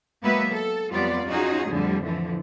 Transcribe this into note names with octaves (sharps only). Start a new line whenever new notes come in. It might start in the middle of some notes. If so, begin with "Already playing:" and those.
F#3 G#3 A#3 B3 B4 E5
A4
F2 F#3 G3 B3 F4 D5
C#4 D#4 F4 F#4 G#4
F2 A2 D3 F3 G3
D3 E3 F3